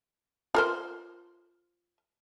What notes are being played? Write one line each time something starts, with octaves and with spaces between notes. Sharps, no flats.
F4 A#4 C5